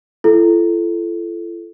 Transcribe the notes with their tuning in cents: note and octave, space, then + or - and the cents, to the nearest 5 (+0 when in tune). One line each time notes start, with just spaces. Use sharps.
F4 -45 A4 -15